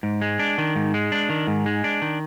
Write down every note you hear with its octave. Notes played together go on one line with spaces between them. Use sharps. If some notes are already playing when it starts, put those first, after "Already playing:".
G#2
G#3
D4
D#3
G#2
G#3
D4
D#3
G#2
G#3
D4
D#3